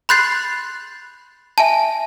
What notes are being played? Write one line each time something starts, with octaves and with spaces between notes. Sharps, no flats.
B5 C6 F#6 G6 A6 C7
E5 G#5 A5